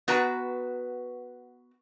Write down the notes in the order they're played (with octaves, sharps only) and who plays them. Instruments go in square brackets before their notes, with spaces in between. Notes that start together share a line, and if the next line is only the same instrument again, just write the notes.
[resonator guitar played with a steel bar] B3 F#4 B4 A#5